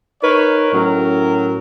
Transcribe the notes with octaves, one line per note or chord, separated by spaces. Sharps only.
D#4 A#4 B4 C#5
A2 F#3 C#4 A#4